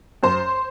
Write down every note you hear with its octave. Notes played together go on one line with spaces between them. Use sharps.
F#2 C5